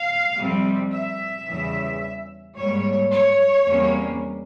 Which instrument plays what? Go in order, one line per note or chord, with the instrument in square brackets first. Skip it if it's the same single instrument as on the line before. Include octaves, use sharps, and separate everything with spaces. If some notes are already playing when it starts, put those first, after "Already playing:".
Already playing: [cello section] F5
F2 C3 G3 C4
E5
E2 C#3 E3 G3
G#2 G3 A#3 C#5
C#5
E2 C3 G3 A#3 C#4